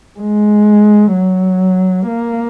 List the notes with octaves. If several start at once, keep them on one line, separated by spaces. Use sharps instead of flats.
G#3
F#3
A#3